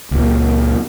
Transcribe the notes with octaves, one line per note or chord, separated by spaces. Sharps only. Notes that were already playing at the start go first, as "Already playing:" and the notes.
C#2 A#2